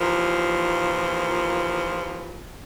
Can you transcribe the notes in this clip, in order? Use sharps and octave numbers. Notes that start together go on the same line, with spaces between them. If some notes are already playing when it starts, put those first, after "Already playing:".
D#2 A#2 E3 F3